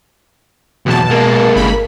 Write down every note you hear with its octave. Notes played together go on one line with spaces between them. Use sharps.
B1 E2 B2 A5
G#3 A#3 A#4
G1 B5
A#4